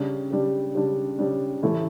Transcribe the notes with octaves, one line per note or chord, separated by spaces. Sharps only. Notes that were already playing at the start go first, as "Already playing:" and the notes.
Already playing: C#3 G3 D4
C#3 G3 D4
C#3 G3 D4
C#3 G3 D4
A2 E3 A3 E4 A4